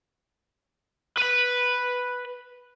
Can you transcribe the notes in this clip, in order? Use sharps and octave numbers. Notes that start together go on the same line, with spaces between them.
B4 B5